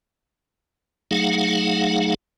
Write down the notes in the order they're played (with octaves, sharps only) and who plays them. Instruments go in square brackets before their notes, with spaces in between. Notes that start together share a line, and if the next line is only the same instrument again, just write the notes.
[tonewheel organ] F#3 A3 D#4 G#4 F5 F#5